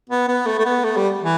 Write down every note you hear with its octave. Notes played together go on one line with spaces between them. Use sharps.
B3
B3
A3
A3
B3
A3
G3
E3